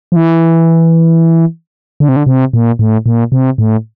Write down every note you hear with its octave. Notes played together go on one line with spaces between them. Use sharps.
F3
E3
D3
C3
D3
C3
A#2
A2
A#2
C3
A2